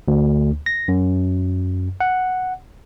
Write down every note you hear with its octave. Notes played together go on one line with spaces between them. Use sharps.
D2
A#6
F#2
F#5